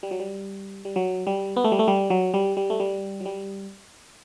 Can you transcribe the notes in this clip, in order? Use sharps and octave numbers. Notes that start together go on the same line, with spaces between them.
G3
F#3
G3
G3
F#3
G3
B3
A3
G3
A3
G3
F#3
G3
G3
A3
G3
F#3
G3